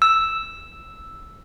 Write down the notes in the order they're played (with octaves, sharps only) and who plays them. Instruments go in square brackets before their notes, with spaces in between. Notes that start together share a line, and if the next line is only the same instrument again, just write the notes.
[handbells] E6